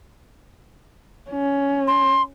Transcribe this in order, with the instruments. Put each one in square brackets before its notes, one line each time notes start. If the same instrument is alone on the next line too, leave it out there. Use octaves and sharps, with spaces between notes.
[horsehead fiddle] C#4
[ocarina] C6